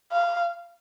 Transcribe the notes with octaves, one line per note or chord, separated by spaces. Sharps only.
F5